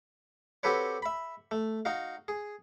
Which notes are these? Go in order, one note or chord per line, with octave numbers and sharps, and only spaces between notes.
C4 F#4 G4 A4 B4 C#5
E5 B5
A3
D#4 F#4 F5
G#4